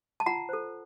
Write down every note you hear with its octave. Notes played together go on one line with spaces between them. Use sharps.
A5
F4 F#5 A#5
A4 C5